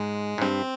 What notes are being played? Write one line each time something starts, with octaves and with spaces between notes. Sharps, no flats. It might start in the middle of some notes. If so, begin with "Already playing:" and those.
Already playing: G#2 G#3
G#2
G2 C4